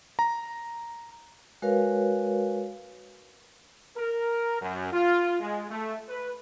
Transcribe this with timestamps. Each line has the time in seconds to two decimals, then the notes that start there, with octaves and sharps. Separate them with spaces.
0.19 A#5
1.62 G#3 F#4 A#4 B4 C#5 F5
3.97 A#4
4.61 F#2
4.92 F4
5.40 G#3
5.70 A3
6.08 B4